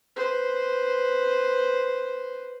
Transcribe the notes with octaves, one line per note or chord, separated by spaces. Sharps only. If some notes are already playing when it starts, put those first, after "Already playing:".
B4 C5